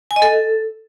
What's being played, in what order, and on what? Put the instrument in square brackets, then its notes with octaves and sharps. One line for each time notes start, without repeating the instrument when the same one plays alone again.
[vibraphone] G#5
D#5
A4